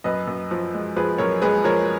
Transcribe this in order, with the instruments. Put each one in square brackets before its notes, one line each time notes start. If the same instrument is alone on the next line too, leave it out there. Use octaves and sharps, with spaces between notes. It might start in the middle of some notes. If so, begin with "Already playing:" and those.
[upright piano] F#2 B4 D#5
F#2
F3
G#3
F3 G#4 B4
F#2 A#4 C#5
G#3 G#4 B4
F3 A#4 C#5